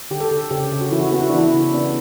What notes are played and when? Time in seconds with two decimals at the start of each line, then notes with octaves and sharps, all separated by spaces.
0.11 D3 G4
0.20 A4
0.31 D3
0.51 C#3 G4
0.71 C#3
0.81 F#4
0.91 E3 E4
1.00 F#4
1.12 B3 F#4
1.21 E4
1.30 D4
1.33 E3
1.38 E4
1.53 C#3
1.74 B3 D4